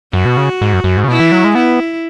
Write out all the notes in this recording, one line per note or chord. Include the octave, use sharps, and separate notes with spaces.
F#2 F#4
B2
C#3
G#2
F#2
F#2
G#2
C#3
B2 E4
E3
F#3
G#3
B3 E4